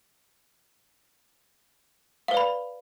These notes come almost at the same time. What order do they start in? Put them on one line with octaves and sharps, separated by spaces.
F5 B4 D5 B5